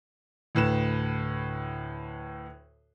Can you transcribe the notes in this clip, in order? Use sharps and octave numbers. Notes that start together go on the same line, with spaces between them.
D2 A2 B4 E7